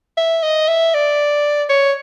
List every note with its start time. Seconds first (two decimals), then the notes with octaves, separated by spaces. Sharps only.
0.17 E5
0.43 D#5
0.68 E5
0.94 D5
1.69 C#5